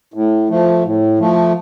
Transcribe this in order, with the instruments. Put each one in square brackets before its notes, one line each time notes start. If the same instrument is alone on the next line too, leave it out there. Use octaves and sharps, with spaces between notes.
[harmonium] A2
F3 A3
A2
F3 A3